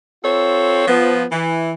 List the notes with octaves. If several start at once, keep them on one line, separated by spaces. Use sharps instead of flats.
C4 F4 A4 C5 C#5
F3 B3
E3